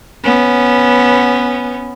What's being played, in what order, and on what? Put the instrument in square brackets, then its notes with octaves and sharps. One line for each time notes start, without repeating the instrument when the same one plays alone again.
[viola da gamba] B3 C#4